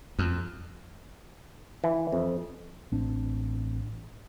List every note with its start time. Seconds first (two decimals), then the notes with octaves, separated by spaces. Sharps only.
0.19 F2
1.84 E3
2.12 F2
2.92 A1 C4 D4